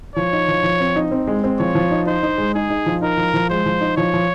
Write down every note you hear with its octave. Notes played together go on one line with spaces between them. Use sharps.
F3 C#5
D#4
F3
F3
C4
D#4
C4
G#3
C4
F3 C#5
F3
D#4
D#4 C5
D#4
G#3
D#4 G#4
D#4
F3
D#4 A#4
F3
F3
G#3 C5
F3
D#4
F3 C#5
F3